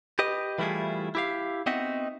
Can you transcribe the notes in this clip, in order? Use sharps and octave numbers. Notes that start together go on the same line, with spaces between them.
G4 B4 D#5
E3 G3 A3 E4 F4 G#4
E4 G4 F5
B3 C4 D#4 F#4 D#5 E5